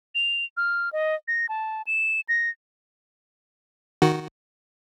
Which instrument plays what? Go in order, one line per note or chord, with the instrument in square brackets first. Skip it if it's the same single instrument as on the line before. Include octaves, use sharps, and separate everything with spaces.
[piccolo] F7
F6
D#5
A#6
A5
E7
A#6
[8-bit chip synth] D#3 F#4